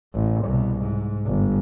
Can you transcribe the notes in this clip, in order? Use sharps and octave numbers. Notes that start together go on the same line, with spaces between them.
A1
C2 B2
G#2
G1